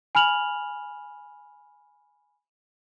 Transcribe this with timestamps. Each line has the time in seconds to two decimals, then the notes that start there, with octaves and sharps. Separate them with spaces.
0.15 G#5 B5 F6 F7 F#7